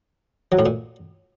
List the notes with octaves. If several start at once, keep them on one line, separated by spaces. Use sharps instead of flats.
F#3
A2
A#2